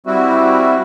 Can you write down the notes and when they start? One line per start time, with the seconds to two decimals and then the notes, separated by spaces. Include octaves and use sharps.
0.06 G3 C4 E4 F#4